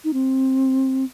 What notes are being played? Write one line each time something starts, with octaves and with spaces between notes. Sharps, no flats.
D#4
C4